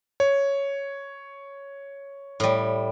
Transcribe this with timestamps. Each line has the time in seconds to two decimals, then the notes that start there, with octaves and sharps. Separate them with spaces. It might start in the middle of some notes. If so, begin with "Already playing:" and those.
0.20 C#5
2.40 A2 G3